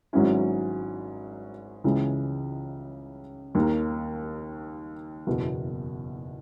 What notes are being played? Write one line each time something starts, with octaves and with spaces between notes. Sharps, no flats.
G#1 G#2 F#3 C#4 E4
C#2 C#3 E3 G#3
D#2 D#3 A#3
F#1 E2 B2